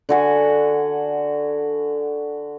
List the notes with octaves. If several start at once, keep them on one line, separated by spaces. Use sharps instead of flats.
D3 F#4 G#5